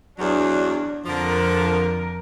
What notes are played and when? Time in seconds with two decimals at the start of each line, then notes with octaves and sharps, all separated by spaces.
0.19 E2 F#3 D4
1.06 F2 D3 F3 A#4